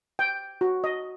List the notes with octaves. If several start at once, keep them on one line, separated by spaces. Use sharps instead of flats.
G5
F#4
D#5